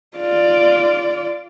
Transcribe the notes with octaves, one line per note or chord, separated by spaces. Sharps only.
F4 D5